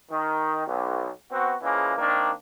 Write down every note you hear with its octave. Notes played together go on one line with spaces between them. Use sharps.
D#3
B1
B3 C4 F#4
C#3 E3 F3 G#3 A#3
D#3 A#3 C4 D4